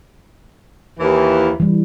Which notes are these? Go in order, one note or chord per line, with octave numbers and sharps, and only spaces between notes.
D#2 E3
E3 G3